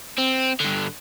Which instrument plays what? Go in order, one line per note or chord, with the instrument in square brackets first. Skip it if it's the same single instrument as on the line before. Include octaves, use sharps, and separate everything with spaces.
[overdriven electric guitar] C4
G2 D3